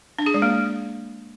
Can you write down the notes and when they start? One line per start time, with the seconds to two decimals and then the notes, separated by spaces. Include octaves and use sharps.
0.19 D4
0.26 G#4
0.34 G#3
0.42 A#3